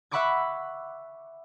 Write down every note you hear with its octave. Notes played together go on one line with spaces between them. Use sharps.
E5 F#5 B5 C#6 D6 G#6